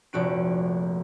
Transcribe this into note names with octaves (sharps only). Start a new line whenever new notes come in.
F1 A#1 F#4 D7